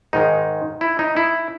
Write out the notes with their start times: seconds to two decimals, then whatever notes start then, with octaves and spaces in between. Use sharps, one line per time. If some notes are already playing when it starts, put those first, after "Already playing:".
0.13 G#2 D#3 G#3 D#4
0.81 E4
0.99 D#4
1.17 E4